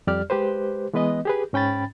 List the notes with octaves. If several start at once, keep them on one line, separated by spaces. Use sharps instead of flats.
F2 G3 G4 D5 F6
G#3 G4 B4 C5
E3 G#3 B3 B4 D#5
G4 G#4 B4
G#2 C#4 G5 B5 A6